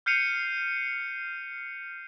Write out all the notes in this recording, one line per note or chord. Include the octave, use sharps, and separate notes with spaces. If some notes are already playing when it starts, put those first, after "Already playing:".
F6 G6 C7 C#7 D#7 F7